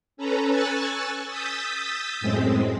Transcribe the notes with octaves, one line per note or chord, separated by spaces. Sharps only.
C#4 A4 B4 A#5
G#5 C#6 E6 F#6 A6
D#6 E6 G6 A6 B6
F#2 A2 G#3 C4